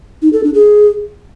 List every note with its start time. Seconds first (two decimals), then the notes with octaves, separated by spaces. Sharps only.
0.22 D#4
0.33 A4
0.44 D4
0.54 G#4